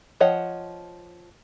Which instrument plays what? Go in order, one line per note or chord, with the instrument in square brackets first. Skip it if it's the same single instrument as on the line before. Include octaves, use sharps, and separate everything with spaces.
[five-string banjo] F3 C#5 D#5 F#5